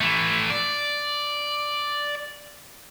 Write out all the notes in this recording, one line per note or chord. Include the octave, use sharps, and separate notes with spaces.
E3 A3
D5